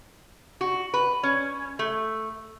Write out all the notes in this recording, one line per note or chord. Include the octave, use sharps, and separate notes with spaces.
F#4
B4
C#4
A3